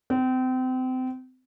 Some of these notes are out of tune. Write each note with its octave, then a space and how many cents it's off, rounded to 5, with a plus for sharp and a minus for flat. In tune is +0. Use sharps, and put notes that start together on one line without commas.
C4 -30